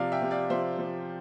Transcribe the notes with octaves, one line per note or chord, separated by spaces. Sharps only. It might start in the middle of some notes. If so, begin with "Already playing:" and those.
Already playing: C3 F3 D5 F5
E5 G5
C3
D5 F5
F3 C5 E5
F3